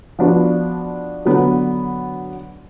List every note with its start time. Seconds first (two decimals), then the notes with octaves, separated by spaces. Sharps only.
0.19 F3 B3 D4 F#4 B4
1.25 D3 F#3 B3